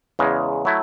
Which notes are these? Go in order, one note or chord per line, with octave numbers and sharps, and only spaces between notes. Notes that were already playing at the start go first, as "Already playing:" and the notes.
E2 C#3 G#3
F#3 A3 E4